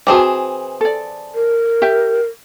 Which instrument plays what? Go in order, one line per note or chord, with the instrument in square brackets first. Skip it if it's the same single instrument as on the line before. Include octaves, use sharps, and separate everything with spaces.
[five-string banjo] E3 C4 G#4 [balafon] F#4 A5 D6
[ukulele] A4 D5
[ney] A#4
[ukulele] G4 E5 G5